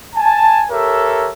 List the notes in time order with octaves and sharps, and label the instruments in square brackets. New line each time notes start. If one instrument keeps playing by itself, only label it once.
[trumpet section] G#5 A5
G4 A4 A#4 C#5 E5